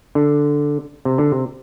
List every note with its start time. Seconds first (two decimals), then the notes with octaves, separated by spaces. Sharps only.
0.15 D3
1.05 C3
1.18 D3
1.32 C3